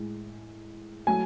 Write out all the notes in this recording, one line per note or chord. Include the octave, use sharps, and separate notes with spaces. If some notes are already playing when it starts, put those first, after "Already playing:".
Already playing: A2 G#3
F#3 A3 G#5